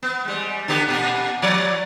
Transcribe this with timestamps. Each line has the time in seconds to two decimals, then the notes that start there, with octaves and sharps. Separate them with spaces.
0.03 B3
0.25 G3 G#3
0.68 D3 B3 G4
0.88 A#2 G4
1.42 F3 C#5 D5